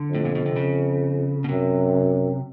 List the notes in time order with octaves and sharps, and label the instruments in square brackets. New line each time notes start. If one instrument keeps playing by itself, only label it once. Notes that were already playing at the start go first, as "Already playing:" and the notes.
Already playing: [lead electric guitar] D3
[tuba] F2 [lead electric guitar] A2
[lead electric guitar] A#2
B2
C3
C#3
B2
[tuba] F#2 [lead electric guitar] C3